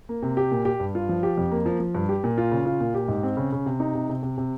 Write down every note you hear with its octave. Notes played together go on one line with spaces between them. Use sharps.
A#3
C3
G4
A#2
G4
G2
F4
F3
G4
F2
A#3
F3
F3
G2
G4
A#2
F4
C#3
F4
A#2
G4
G#2
C4
C#3
C#3
C3
D#4
C3
C3
C3
C3